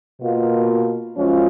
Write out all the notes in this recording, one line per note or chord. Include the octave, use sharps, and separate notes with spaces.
B2 A#3 F4
F#2 F3 G#3 C#4 F4